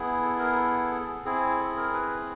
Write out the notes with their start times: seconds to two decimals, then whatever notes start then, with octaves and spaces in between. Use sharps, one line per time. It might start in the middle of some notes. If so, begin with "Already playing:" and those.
Already playing: B3 E4 G#4
0.22 A4
0.39 A#4
0.56 A4
1.25 C4 E4 G#4
1.59 A4
1.77 A#4
1.94 B4